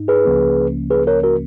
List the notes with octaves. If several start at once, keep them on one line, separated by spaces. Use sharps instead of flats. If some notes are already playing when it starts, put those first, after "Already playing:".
Already playing: G#2 D#4
G#4 B4
C#2 C#3 F3 A#3 C#4
G#4 B4
A#4 C#5
F#4 A#4